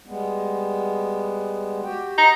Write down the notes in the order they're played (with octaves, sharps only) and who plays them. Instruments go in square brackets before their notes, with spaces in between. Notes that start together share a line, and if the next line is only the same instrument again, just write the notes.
[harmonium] G3 G#3 B3
F#4 G4 G5
[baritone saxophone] D#4 [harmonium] F#5